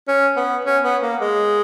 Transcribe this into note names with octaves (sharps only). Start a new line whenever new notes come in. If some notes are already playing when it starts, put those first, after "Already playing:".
C#4
B3
C#4
B3
A#3
G#3